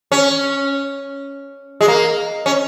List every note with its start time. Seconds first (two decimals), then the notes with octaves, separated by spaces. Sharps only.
0.12 C#4
1.81 G#3
1.88 A#3
2.46 C#4